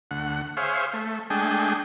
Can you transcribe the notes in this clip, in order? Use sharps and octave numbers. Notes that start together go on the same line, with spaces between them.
D2 F#5
G#4 C5 C#5 E5 F5
A3
G#3 A3 D4 G#4 G5